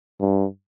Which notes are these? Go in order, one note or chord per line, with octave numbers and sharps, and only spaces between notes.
G2